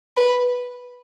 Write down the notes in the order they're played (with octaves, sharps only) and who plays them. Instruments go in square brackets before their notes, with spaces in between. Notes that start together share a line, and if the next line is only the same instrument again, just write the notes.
[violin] B4